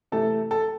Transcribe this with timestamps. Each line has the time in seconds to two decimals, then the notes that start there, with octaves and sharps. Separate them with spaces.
0.12 C3 E3 A3 A4
0.51 A4